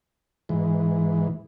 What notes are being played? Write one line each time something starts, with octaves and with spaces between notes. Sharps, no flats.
G#2 E3